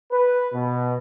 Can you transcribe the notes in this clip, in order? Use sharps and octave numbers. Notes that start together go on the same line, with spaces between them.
B4
B2